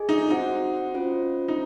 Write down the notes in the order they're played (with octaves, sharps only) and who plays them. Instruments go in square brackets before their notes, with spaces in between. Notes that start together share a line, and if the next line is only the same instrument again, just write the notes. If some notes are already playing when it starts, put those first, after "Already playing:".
Already playing: [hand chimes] G#4 D#5 G#5
[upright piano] D#4
[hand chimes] C4 F#4 C5 F#5 [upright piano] D#4
[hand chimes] C#4 F4 C5
[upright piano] D#4